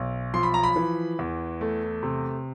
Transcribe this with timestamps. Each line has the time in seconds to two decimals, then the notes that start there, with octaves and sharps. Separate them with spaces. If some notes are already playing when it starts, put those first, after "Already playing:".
Already playing: B1
0.34 F3 C6
0.43 B5
0.54 A#5
0.63 B5
0.76 E3
1.19 E2
1.61 A3
2.03 C3